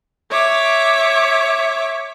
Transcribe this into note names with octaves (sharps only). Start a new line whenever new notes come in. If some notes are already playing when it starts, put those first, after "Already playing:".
C#5 E5 D6